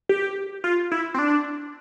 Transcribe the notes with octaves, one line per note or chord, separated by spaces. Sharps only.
G4
F4
E4
C4
D4